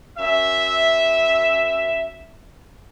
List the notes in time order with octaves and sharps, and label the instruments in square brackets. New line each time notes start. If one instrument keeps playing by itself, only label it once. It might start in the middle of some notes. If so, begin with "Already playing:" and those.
[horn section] F#2 E5